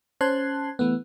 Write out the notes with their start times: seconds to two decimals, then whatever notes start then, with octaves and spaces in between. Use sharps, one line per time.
0.21 C#4 C5 A5 F#6 G#6 C7
0.79 E3 A3 B3